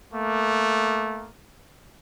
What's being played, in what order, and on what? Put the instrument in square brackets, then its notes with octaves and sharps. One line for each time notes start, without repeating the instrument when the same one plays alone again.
[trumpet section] A3 A#3